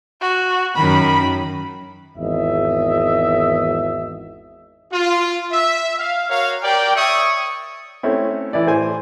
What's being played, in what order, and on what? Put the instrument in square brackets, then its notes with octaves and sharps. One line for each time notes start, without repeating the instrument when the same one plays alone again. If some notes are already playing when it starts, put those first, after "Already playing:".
[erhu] F#4
[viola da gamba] F#2 D#3 [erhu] B5
[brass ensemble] G#1 E2 D#5 E5
[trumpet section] F4
E5
F5
F#4 A#4 C#5 F5
G4 A#4 D5 G5
C#5 D5 E5 C#6 D#6
[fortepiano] A3 C4 C#4 E4
E3 E4 D5
A2 C5 G#5